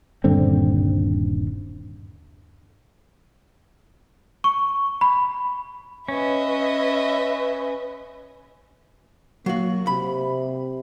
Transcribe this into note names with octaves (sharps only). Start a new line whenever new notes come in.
D#1 G2 D3 C4
C#6
B5
C#4 B4 D#5 E5
F#3 A#3 F#4
C3 B5